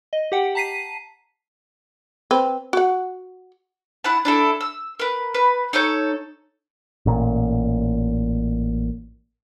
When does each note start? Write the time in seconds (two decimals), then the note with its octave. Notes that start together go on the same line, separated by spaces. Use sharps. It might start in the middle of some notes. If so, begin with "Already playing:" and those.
0.13 D#5
0.32 G4 F#5 G5
0.55 A5 A#5 B6 C7 D#7
2.31 C4 B4
2.73 F#4 F#5
4.04 E4 F#5 A5
4.25 D4 E4 A4
4.61 E6
5.00 A#4 B4
5.34 B4
5.73 D#4 A4 C#5 G6
7.06 A1 A#2